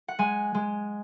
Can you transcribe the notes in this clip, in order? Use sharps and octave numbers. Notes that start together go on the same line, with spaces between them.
F#5
G#3 G#5
G#3